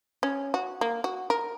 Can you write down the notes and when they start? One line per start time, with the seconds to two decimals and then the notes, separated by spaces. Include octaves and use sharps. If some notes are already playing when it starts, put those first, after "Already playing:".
0.23 C#4
0.54 F#4
0.81 A#3
1.04 F#4
1.30 A#4